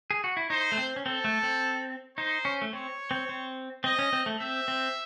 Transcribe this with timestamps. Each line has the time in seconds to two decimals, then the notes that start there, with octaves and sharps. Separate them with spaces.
0.11 G#4
0.24 F#4
0.37 E4
0.50 D#4 C5
0.72 A3
0.78 C4
0.96 C#4
1.06 C4 A4
1.24 A3
1.43 C4
2.17 D#4 C5
2.45 C#4
2.62 A3
2.72 C4 C#5
3.11 C4
3.29 C4
3.84 C4 D#5
3.99 C#4
4.13 C4
4.26 A3
4.40 C4 E5
4.68 C4